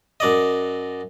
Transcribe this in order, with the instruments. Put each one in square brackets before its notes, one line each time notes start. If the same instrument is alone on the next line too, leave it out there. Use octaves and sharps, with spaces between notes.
[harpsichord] F#2 D5 D#5